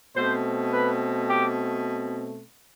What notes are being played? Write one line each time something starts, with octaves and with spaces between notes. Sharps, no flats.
B2 A3 C4 C5
B4
G4